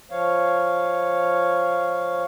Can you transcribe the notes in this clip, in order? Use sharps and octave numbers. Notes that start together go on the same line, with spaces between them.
F3 C#5 F5